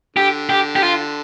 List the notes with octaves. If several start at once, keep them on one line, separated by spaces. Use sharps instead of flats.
D3 G4
G4
G4
F4